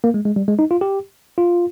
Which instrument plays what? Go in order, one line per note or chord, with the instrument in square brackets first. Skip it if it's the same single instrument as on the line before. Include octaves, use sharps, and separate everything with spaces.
[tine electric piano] A#3
G#3
G#3
G3
G#3
D#4
F4
G4
F4